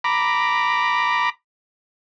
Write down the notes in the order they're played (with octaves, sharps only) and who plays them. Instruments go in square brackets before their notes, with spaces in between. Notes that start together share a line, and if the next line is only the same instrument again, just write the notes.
[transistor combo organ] A#5 B5 D6